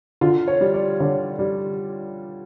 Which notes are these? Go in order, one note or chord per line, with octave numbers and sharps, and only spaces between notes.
D3 F4
C#5
G3
D5
D3 C#5
G3